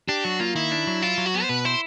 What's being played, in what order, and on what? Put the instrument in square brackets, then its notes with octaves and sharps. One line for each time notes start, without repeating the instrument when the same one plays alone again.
[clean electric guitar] D4 [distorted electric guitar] G4
[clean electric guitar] F#3 [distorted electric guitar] F#4
[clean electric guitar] A#3 [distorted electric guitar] F4
[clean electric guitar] D#3 [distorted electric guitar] E4
[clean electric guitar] D4
F#3
[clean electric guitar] E4 [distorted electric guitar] F4
[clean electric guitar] F#3
[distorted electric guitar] F#4
[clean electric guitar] B3
[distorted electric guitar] C5
[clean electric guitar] B2 [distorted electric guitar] B4
[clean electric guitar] E4 [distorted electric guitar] C5